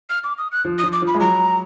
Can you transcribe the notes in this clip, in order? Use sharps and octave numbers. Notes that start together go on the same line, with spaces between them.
F6
D6
D#6
F#6
F3
D#6
F3
D6
F3
B5
G#3
F#3 A#5